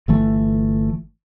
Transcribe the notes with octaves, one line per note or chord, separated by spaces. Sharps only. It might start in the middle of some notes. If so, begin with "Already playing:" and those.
G1 E3 A3